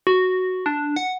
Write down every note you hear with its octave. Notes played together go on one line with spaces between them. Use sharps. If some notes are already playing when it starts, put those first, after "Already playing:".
F#4
D4
F#5